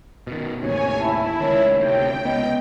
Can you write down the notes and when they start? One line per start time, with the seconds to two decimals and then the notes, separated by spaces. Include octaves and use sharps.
0.27 B2 D#3
0.62 A1 D#2 C3 C#5 G#5
0.98 E4 A5
1.40 C#2 D#3 C#5
1.81 D2 C3 C#5 G5
2.25 C#2 B3 D#5